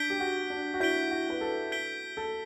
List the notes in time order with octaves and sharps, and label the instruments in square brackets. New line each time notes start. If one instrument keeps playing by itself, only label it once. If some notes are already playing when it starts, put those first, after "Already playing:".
Already playing: [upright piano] D4 [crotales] G6 B6 D7 G7
[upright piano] G4
F#4
D4
F#4
[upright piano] E4 [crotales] G6 B6 D7 G7
[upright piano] F#4
B4
A4
[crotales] G6 B6 D7 G7
[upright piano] A4